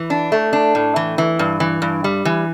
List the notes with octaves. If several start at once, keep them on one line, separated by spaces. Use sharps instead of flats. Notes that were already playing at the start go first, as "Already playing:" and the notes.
Already playing: E3
D4
A3
D4
A2
E3
E3
G2
E3
G2
G3
E3